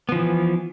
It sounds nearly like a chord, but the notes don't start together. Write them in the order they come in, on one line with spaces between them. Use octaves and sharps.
B3 F3 E3